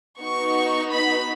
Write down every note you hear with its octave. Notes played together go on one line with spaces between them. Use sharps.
B3 D#4 F#4 C#6
B5